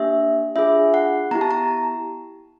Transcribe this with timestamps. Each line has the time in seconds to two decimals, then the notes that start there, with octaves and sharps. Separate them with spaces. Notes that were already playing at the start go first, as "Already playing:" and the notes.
Already playing: A#3 D4 G4 E5
0.56 D4 F4 G#4 E5
0.94 F#5
1.31 B3 E4 G4 A#5
1.41 A5
1.51 A#5